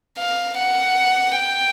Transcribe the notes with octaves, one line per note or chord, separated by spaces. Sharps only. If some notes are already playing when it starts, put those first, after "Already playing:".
F5
F#5
G5